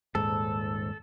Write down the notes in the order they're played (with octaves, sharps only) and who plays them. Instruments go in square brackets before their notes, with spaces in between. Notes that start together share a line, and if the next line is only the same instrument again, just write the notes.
[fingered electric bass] D#1 G#2 [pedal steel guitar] A4